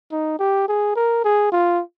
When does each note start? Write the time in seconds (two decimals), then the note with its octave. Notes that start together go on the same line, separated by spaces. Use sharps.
0.12 D#4
0.40 G4
0.69 G#4
0.96 A#4
1.25 G#4
1.52 F4